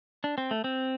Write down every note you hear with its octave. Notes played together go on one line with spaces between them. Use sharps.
D4
C4
A3
C4